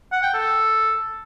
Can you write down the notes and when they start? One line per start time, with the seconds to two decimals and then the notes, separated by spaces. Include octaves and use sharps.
0.12 F#5
0.23 G5
0.34 A4